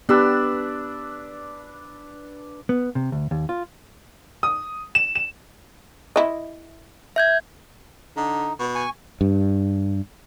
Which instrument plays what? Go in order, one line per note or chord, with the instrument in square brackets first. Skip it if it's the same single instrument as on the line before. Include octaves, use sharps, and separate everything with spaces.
[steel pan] B3 G4 [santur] D4 B4 E6
[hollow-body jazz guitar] B3
C3
D2
D#2
F4
[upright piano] D#6
E7
E7
[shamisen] E4 D#5
[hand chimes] E5 G6 G#6
[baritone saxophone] D3 [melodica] D#4
[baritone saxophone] B2
[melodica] G#5 C#6
[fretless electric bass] G2